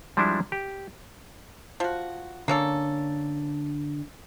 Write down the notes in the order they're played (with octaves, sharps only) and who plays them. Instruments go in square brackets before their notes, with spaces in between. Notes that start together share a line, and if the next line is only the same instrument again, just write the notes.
[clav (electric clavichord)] F3 G3 G#3 D4 E4
G4
[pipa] F3 F#4
[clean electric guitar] D3 D4 [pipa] A#3 C#4 A4